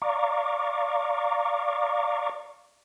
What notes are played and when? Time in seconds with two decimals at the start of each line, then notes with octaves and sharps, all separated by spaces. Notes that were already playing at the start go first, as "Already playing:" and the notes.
0.02 D5 F5 A#5 C#6 D6